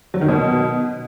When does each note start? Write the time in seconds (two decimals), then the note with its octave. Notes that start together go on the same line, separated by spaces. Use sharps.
0.14 F#3
0.21 D#3
0.29 B2